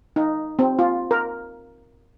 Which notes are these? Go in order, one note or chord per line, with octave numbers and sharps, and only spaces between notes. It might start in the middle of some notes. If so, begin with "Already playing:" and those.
D#4
C4
F4
A#4